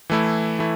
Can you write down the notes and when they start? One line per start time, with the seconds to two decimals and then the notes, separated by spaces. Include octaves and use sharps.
0.10 E3 A3 E4
0.59 E3 A3 E4